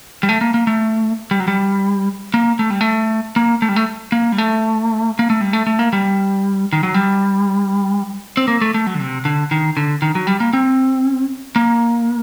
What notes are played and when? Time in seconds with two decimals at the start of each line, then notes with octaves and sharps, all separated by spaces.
0.23 G3
0.29 A3
0.41 A#3
0.54 A#3
0.67 A3
1.31 G3
1.40 F#3
1.48 G3
2.34 A#3
2.59 A3
2.70 G3
2.81 A3
3.36 A#3
3.62 A3
3.69 G3
3.76 A3
4.12 A#3
4.32 G3
4.38 A3
5.19 A#3
5.30 A3
5.41 G3
5.53 A3
5.67 A3
5.79 A#3
5.93 G3
6.73 D#3
6.83 F#3
6.94 G3
8.37 C4
8.48 A#3
8.61 A3
8.74 A3
8.87 F#3
8.94 D3
9.00 C3
9.25 D3
9.51 D#3
9.77 D3
10.02 D#3
10.15 F#3
10.27 G3
10.40 A#3
10.53 C4
11.56 A#3